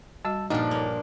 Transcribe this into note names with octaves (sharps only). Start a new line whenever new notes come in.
G3 F#4 D#5 A5 E6
G2 A#2 F3 D4 D#4 F#5
A#3 A#4 C#5